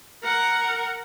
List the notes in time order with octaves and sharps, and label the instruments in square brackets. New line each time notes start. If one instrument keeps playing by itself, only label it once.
[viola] A#4 F#5